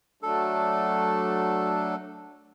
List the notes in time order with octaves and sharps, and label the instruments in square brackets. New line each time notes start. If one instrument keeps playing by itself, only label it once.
[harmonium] F#3 A3 D4 [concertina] A4